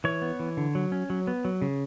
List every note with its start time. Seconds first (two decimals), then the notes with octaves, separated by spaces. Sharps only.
0.04 E3 C#5
0.22 B3
0.40 E3
0.57 D3
0.75 F#3
0.92 C#4
1.10 F#3
1.27 B3
1.45 F#3
1.62 C#3